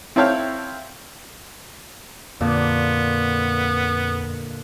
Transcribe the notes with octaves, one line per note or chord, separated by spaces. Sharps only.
C4 E4 A4 C#5 F5 G5
F2 A#2 D3 B3